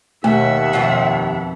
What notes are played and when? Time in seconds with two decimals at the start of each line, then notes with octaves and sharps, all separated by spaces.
0.24 D#2 B2 A3 E5 F#5
0.73 F2 B2 F4